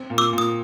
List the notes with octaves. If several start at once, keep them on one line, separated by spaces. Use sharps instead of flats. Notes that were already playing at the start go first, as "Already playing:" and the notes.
Already playing: C4
A#2
D6 E6
A#2
D#6